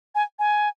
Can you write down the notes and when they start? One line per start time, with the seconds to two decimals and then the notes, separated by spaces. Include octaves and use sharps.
0.15 G#5
0.39 G#5